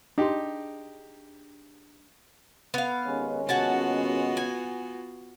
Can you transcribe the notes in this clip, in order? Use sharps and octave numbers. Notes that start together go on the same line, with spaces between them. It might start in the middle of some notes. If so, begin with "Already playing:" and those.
D4 D#4 G4 G#4 C6
B3 F5
D#2 G#3 C#4
B3 F4 F#4 F#5 G#5 A5
G#5